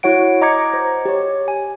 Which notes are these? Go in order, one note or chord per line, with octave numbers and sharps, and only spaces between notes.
E4 F#4 C#5 F#5 D7
D#5 A#5 D6 G#6 C#7
C5
G4 C#5
G#5